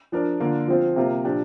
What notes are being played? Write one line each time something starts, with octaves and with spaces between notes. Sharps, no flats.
F3 D4 A#4 D5
D3 A#3 D4 F4
F3 C4 F4
C3 A#3 F4 A#4
A#2 F3 D4 G4